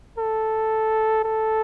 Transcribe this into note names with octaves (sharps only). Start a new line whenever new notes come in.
A4
A4